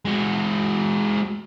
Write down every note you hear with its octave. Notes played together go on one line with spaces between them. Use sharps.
G#3 F#4